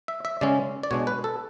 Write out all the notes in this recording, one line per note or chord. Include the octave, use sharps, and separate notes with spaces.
E5
E5
C#3 G#3 C#4 D5
D5
B2 G#3 D4 C#5
B4
A4